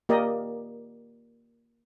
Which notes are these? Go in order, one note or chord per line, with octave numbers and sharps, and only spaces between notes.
A#3 G4 A#4 D5 D#5